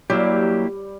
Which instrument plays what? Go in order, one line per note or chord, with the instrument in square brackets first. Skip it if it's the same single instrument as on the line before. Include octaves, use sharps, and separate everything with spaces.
[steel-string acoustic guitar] F#3 [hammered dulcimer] G3 [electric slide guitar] A#3 E4 G4